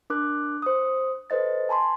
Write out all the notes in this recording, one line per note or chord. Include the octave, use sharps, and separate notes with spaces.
D4 A#4 D6 F#6
C5 D#6
A4 B4 C5 D#5 A6
G#5 A5 B5 C6